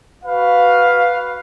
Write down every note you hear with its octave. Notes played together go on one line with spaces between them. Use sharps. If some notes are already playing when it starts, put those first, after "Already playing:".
F#4 B4 F5